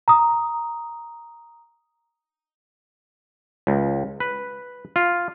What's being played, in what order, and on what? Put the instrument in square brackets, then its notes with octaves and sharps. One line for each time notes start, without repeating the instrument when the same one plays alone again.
[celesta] A#5 D#6
[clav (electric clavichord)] C#2
B4
F4